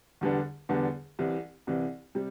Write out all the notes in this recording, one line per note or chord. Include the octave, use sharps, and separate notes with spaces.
E2 D3 G3 B3 D4
E2 D3 G3 B3 D4
C2 C3 E3
C2 C3 E3
C3 G3